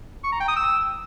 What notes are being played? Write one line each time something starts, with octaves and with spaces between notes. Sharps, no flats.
C#6
A#5
G5
D#6
E6